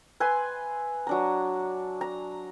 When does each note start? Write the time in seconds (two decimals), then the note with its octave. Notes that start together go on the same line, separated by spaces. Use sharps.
0.20 B4 E5 G#5 C6
1.07 F#3 D4 A#5
2.01 A#5